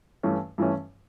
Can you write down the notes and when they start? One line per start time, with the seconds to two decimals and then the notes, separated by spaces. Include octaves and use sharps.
0.23 G2 E3 A3 C#4
0.58 G2 E3 A3 C#4